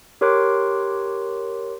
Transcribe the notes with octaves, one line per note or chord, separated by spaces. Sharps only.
G4 A#4 C#5 C6 D6 F#6